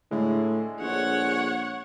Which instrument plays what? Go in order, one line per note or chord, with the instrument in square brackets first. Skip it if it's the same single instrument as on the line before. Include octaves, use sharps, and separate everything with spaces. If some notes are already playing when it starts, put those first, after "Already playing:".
[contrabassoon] A2 [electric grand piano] D3 G#3
[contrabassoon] A#1 [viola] C#5 F#5